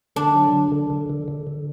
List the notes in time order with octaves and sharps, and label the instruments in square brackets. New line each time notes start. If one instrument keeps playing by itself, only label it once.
[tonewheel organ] D3 [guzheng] D4
[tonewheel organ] F#3
D3
D3
D3
D3
D3
D3